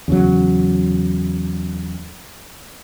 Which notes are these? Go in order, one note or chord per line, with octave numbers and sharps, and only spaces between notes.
E2 C#3 F#3